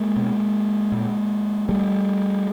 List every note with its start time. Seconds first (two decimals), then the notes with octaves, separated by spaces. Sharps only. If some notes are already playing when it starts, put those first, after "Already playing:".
Already playing: G#3 A#3
0.16 B2
0.92 A#2
1.69 A2 G3 A3